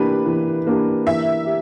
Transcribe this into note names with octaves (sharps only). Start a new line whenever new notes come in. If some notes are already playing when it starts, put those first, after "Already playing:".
Already playing: E3 A#3 D4 G4 B4
E3
A#3 D4 G4
E3 E5
G4